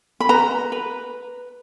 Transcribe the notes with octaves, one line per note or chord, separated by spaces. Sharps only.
B5
B4 A#5
B4